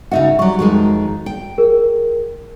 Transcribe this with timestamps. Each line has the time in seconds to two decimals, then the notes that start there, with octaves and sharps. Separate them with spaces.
0.11 C#3 D#4 F#4 E5 F#5
0.39 F#3 G3 C#6
0.59 F2 D#3 G#3 F#4
1.26 G5
1.58 G#4 A#4